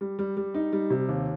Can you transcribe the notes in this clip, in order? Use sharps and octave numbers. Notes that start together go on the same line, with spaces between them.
G3
G3
G3
D#4
G3
C3
D#2